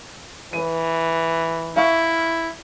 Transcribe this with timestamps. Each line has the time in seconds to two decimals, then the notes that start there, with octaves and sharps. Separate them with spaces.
0.53 E3 B4 D#7
1.76 E4 E5 F5 C#6